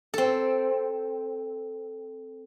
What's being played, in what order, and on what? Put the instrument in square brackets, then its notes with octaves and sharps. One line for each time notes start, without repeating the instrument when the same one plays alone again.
[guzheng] C4 A4